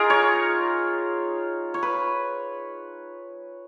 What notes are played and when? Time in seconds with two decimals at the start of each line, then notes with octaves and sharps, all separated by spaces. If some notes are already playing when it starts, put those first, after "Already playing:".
Already playing: D#4 F4 G#4 A#4
0.10 C#5
1.74 C#5
1.83 B4